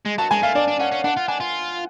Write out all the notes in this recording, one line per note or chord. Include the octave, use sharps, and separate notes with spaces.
G#3
F#3 A5
G#3 G#5
A3 F5
D4 D5
D4
C#4 F#5
C#4
D4 F#5
F4
D4 G#5
F4